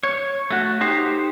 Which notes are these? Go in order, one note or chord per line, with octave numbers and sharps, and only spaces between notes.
C#5
A3 F#4
D#4 G4 C5